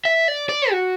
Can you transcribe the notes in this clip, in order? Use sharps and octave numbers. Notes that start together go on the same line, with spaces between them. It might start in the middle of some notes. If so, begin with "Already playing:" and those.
E5
D5
D5
F#4